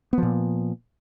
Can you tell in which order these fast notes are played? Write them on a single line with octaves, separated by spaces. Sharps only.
B3 F3 A#2